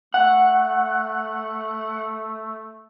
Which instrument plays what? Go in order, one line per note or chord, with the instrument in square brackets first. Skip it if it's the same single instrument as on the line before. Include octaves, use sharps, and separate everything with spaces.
[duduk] A3 [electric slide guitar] F#5